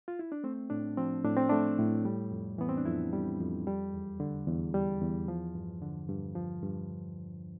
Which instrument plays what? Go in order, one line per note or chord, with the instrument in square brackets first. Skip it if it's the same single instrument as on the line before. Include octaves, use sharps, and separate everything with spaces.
[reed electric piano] F4
E4
D4
A3 C4
A2 D4
F3 C4
A2 D4
C4
A3 D4
A2
G3
F2
E3 B3
C4
D4
F2 E4
G3
F2
G3
E2
D3
E2
G3
E2
F3
G2
D3
G2
F3
G2